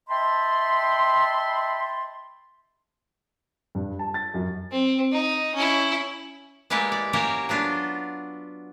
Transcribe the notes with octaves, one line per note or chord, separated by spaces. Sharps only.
D#5 E5 G5 A5 B5 C6
G2
A5
A6
F#2
C4
D#4
C#4 E4
G#3 A#3 E4 G4 B4 D5
D5
A#3 C#4 F#4 G4 A#4 C#5
F#3 B3 D4 F4